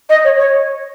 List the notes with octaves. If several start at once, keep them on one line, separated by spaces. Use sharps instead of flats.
D#5
C#5
C#5